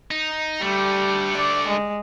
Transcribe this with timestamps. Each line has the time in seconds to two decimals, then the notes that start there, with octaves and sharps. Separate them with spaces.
0.11 D#4
0.62 D3 G3 A3
1.37 D5
1.68 G#3